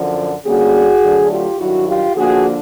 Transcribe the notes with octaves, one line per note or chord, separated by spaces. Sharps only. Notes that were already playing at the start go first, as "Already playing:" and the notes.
Already playing: F#2 D3 F3
D2 D3 G3 A#3 C#4 F#4 G#4
D2 D3 F#3 A3 D4
F4 G4
G2 D#3 F#3 E4 F#4
F4 G4
D3 F3 A#3 D4 F#4 G#4